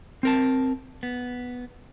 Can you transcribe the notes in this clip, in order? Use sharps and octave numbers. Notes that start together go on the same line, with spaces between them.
C4 A#4 A5
B3